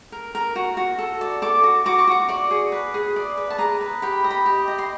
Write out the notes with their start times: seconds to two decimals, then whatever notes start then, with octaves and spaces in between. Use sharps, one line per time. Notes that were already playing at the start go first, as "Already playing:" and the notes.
0.12 A#4
0.35 A#4
0.56 F#4
0.77 F#4
0.98 A4
1.21 D5
1.42 A4 D6
1.64 F#4
1.86 F#4 D6
1.98 C#6
2.07 F#4 D6
2.28 D5 C#6
2.51 G#4
2.72 B4
2.94 G#4
3.16 D5
3.37 B4
3.50 A5
3.58 G#4 A#5
3.81 B4
4.02 G4 B5
4.24 D#5
4.31 B5
4.46 G4
4.68 D#5
4.78 C6